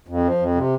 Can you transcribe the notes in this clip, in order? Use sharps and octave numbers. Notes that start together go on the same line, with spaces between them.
F2
F3
F2
C3